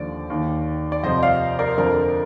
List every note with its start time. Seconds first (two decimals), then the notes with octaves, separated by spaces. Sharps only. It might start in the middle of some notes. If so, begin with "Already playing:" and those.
Already playing: D#2 D3 F3 D5
0.30 D#2 D#3
0.92 D5
1.03 F2 C3 F3 C5 D#5
1.22 D5 F5
1.59 A#4 D5
1.78 F2 D3 F3 A#4 D5